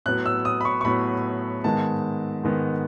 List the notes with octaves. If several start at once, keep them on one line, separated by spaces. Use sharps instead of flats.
A2 F#3 B3 F#6
E6
D#6
B5
C#6
C#6
A2 F#3 B3 B5
G#2 D#3 G#3 B3 A5
G#2 D#3 G#3 B3